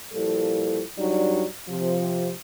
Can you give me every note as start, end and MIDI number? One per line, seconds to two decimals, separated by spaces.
0.13 0.81 46
0.13 0.81 53
0.13 0.81 55
0.13 0.81 64
0.13 0.81 69
0.98 1.44 42
0.98 1.44 54
0.98 1.44 55
0.98 1.44 62
0.98 1.44 63
0.98 1.44 74
1.69 2.31 48
1.69 2.31 53